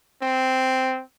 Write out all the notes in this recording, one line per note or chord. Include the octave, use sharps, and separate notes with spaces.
C4